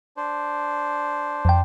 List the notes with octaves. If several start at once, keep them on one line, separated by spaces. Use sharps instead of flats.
D4 C5
F2 G5